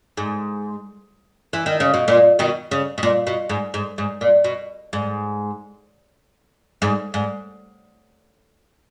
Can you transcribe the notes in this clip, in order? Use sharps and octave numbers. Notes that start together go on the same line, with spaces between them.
G#2
E3
D#3
C#3
B2
A#2
B2 D#3
C#3
B2
A#2
B2
G#2
G#2
G#2
A#2
B2
G#2
G#2
G#2